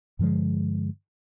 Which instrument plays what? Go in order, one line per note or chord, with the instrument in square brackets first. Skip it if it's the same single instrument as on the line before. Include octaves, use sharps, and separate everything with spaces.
[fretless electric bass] G2 D3 F3 G#3